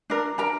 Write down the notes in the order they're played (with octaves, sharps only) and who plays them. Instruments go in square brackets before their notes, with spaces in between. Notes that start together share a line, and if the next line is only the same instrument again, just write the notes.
[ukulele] D4 A#4
D4 A#4 A#5